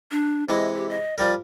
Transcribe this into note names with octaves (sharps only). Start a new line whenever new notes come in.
D4
C3 E3 G#3 D#5
G4
D#5
F3 G3 A#4 D5